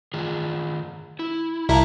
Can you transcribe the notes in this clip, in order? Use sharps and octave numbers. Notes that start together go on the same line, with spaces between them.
D#3 F4 G#4
E4
C2 E4 E5 F5 A5 A#5